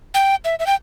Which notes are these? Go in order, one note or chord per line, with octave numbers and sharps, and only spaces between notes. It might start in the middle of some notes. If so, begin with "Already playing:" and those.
G5
E5
E5
G5